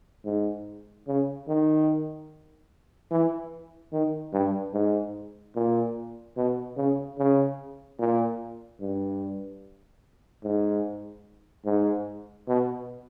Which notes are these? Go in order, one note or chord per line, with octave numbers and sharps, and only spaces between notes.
G#2
C#3
D#3
E3
D#3
G2
G#2
A#2
B2
C#3
C#3
A#2
G2
G#2
G#2
B2